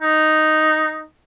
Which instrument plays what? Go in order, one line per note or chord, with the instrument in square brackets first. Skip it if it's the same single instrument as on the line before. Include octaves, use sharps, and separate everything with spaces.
[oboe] D#4